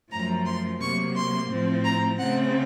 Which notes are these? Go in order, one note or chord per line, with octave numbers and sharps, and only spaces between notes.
F#2 F3 A3 A#5
C6
C3 F#3 A#3 C#6
C6
A2 F3 C4
A#5
C#3 A3 C4 F#5